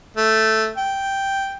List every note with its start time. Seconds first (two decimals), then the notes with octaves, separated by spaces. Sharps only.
0.17 A3
0.78 G5